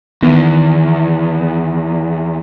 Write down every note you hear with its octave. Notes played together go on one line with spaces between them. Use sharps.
E2 D#3 B3